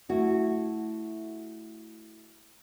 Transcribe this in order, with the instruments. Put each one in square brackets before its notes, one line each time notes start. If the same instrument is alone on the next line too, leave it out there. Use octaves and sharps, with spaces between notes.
[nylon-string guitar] A3 E4 F#4